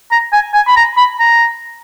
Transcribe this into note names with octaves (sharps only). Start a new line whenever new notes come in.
A#5
G#5
G#5
B5
A#5
B5
A#5